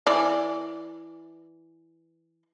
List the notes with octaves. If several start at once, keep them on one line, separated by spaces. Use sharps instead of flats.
E3 D5